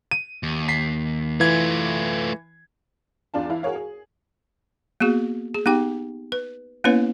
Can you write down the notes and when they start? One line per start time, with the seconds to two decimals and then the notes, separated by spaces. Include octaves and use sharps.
0.11 D#7
0.43 D#2
0.69 B6 C7
1.40 E3 A3 F4 G#6
3.34 E2 D4 F4 A5
3.49 E3 E4 F5
3.63 F#4 G#4 A#4 C#5 F5
3.76 G#4
5.00 A#3 B3 F#4 G#4
5.54 G#4
5.66 B3 D#4 G4 G5
6.32 B4
6.84 A#3 B3 C#4 E4 B4 C#5